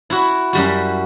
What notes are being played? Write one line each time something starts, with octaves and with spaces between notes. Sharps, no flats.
E4 F#4
F#2 G3 F#4